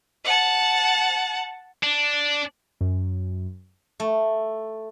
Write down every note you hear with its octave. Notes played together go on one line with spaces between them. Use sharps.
F#5 A5
D4
F#2
A3